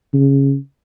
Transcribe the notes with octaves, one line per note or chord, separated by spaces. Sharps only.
C#3